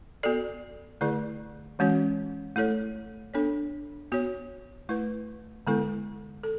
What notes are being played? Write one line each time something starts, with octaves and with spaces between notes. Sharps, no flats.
B3 F#4 A4 D5
D3 A3 E4 G#4 D5
E3 G#3 C#4 F#4 C#5
A3 E4 A4 C#5
B3 D4 A4 C#5
B3 F#4 C#5
A3 E4 B4
D3 G#3 B3 E4 A4
A4